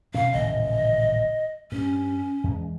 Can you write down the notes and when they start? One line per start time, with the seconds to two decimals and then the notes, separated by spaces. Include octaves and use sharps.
0.14 B2 C#4 F5
0.33 D#1 A1 C#3 D#5
1.72 G2 C#4
2.44 E2 G#3